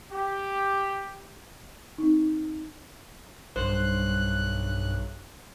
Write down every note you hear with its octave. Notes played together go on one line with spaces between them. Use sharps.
G4
C4 D#4
B1 G2 C5 F#6